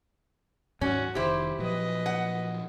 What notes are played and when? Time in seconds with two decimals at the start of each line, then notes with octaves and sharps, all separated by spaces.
0.81 D#2 G#2 F#3 C#4 F#4
1.15 F1 D#3 E4 G4 C5
1.59 A#2 F3 F#3 B4 D#5
2.06 F#5